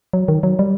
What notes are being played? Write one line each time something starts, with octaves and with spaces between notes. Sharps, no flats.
F#3
D#3
F#3
G3